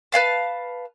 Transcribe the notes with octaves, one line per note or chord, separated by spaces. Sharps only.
B4 D5 F5 A5